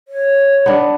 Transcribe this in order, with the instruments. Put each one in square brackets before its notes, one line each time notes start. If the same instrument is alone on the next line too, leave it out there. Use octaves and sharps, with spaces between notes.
[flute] C#5
[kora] B3 D4